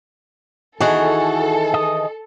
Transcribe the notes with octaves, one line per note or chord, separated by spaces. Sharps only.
D#3 E3 F#4 G#4 A4
D#5